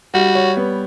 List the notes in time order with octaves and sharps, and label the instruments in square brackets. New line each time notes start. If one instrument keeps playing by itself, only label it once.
[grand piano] G3 [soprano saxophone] F#4
[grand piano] C#5
B3